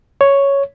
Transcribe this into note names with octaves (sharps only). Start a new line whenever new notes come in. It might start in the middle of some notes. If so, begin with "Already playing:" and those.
C#5